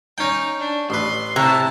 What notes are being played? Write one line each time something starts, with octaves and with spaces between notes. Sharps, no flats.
C#4 D#4 G5
D4
A1 B4 C6
C3 E4 A5